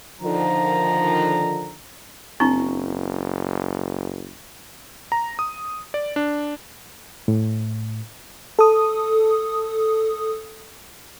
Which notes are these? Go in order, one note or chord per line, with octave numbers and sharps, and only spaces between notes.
D3 D#3 F3 A#5
F#1 C4 D4 E4 C#6
A#5
D#6
D5
D4
A2
A4 D#6